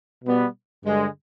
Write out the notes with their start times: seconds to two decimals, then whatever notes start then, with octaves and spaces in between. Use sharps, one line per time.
0.25 B2 G3 B3
0.85 G2 D3 G#3